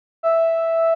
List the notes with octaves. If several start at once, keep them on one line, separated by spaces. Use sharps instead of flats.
E5